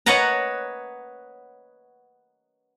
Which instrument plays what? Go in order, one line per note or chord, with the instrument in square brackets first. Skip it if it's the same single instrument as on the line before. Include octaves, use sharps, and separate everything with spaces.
[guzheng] B4 C#5 D#5 F#5 A5 A#5